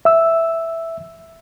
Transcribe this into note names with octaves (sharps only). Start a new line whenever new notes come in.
E5 E6